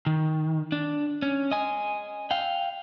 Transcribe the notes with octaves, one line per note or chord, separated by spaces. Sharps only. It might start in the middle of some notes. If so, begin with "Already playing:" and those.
D#3
D4
C#4
D#5 G#5
F5 G5